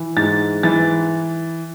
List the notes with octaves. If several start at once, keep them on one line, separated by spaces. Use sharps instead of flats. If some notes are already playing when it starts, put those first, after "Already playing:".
Already playing: E3
G#2 A6
E3 A6